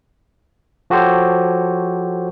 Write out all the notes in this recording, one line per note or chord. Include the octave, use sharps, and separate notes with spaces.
F3 F#4 G4 A4 C5 C#5